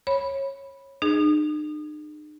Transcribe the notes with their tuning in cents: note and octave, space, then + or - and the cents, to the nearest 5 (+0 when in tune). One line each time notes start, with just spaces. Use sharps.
C#5 -20 B5 -10
D#4 -45 G#4 +0